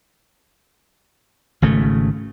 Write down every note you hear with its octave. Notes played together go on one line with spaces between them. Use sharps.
G#1 C#3 A3